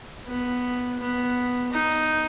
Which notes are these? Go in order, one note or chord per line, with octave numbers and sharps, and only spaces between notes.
B3
B3
D#4